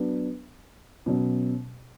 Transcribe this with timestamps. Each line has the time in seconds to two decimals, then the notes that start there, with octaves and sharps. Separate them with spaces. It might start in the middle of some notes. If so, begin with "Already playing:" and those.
Already playing: F#3 B3 D4
1.06 B2 F#3 C#4